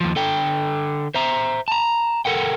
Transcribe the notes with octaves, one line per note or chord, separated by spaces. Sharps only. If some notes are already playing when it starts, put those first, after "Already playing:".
D#2 F3
D3 A4 G5
C5 E5 A#5
A5 A#5
A4 A#4 F#5 G5